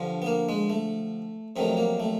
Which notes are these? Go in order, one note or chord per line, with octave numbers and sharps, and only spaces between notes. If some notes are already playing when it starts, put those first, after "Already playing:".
Already playing: G2 D3 F3
B3
A#3
G#3
A3
F2 C3 D#3 F#3 A3
A#3
A3